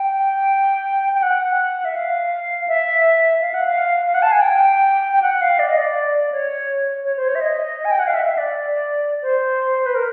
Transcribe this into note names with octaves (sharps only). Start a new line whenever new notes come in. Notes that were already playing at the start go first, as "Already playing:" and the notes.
Already playing: G5
G5
F#5
E5
F5
E5
F5
F#5
F5
F5
F#5
A5
G#5
G5
G5
F#5
F5
D5
D#5
D5
C#5
C#5
C5
C#5
E5
D#5
G#5
G5
F#5
F5
E5
E5
D5
C5
B4
A#4